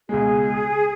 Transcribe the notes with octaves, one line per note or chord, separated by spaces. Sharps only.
C#2 B2 G#3 G#4